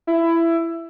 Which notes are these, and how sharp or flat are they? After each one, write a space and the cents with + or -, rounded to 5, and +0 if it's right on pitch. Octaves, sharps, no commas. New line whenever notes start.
E4 +15